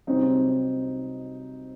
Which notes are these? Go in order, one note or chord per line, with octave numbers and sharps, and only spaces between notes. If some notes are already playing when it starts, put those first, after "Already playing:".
C2 C3 F#3 C4 D#4